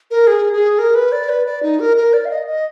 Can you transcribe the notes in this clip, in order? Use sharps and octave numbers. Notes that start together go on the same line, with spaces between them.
A#4
G#4
G#4
A#4
B4
D5
B4
D5
D#4
A#4
A#4
D5
F5
D#5
D#5